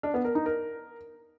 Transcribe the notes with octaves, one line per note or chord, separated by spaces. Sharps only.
D4
B3
A#4
D#4
A#4